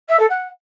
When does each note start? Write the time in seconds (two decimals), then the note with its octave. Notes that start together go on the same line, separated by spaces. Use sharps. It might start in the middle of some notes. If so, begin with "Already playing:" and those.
0.08 E5
0.19 A4
0.30 F#5